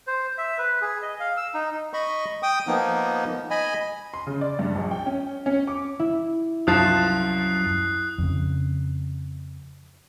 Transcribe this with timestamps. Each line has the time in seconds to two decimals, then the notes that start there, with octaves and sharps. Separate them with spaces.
0.07 C5
0.38 E5
0.58 B4
0.81 G#4
1.02 D#5
1.20 F5
1.37 E6
1.54 D#4
1.94 D#5 B5 C#6
2.43 G5 D#6
2.67 F3 A#3 B3 D#4
3.50 D#5 G#5 B5
4.14 C6
4.27 C#3
4.41 D5
4.59 G2
4.75 A#1
4.91 G5
5.06 C#4
5.46 C#4
5.67 D6
5.99 E4
6.67 C2 F#2 F3 A5 D#6 F#6 C7
8.18 F2 C#3